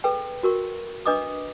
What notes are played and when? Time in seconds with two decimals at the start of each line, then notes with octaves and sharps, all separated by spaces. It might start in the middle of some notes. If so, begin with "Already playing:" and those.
0.04 G#4 A4 B4 G5
0.43 F#4 A#4 C#6
1.06 D4 B4 D#5 D6 D#6